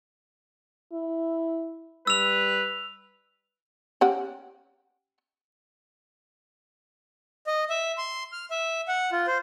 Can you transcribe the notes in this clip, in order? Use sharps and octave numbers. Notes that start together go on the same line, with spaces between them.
E4
G3 B4 E6 F7
C#4 G4 F#5
D#5
E5
C6
F6
E5
F#5
F4
C5